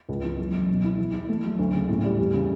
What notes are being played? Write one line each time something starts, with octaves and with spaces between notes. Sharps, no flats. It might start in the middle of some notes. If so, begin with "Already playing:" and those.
C#2
E3
F#2
F#2
B2
E4
E3
E4
A3
F#3
D2
C#3
A2
G3
E2
C#3